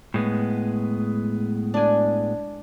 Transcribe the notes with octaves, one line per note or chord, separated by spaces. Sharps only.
A2 G#3 B3
D4 G#5